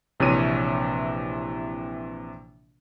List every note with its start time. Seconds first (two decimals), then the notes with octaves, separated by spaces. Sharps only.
0.20 A#1 C3 E3 C4 C#5 D#7